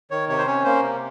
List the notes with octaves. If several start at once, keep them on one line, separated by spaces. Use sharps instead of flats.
D#3 C#5
C3 C#5
C5
C#4 C#5
A#3 C5
C3